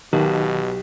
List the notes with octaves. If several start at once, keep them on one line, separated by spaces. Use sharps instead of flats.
B1 B2 D#3 G4 A5